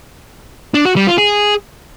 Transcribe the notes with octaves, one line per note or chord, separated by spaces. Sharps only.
D4
F#4
G3
F4
G#4